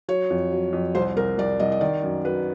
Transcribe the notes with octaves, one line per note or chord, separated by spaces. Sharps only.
F#3 C#5
F2
F#3
F2
C2 C5
C2 A#4
C2 D5
C2 D#5
D#5
D#3 D5
F#2
F#3 B4